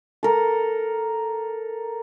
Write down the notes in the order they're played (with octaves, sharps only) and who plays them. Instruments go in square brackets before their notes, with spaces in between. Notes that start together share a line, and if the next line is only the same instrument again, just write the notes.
[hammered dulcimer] A4 A#4